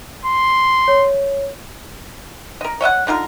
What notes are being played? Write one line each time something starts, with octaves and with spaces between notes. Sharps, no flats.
C6
C#5
A#4 D#5
C#5 D#5 E5 F#5
D3 D#4 F4 A#4